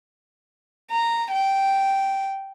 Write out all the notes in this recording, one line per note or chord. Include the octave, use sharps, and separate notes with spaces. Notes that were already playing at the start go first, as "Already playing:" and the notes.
A#5
G5